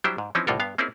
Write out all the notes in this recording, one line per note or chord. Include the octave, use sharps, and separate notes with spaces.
F#3 G3 D4 E4 G4 C5
G#2
E3 F3 C4 C#4 D#4 E4
C2 A2 D3 F4 A4 A#4
G2 B3 F5
A#3 C4 C#4 D#4 E4 G#4